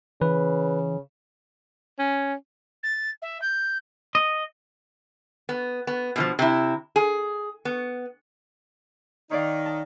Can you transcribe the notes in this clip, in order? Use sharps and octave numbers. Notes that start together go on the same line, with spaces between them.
C#3 E3 B4
C#4
A6
E5
G6
D#5
B3
B3
B2 D#3 F3
C3 E4
G#4
B3
D#3 D#4 C#5 D5 F5
A5